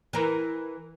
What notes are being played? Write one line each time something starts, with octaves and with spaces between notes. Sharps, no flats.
E3 A#4